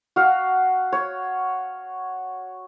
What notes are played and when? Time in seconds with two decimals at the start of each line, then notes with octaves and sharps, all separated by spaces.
0.16 F#4 F5
0.92 C#5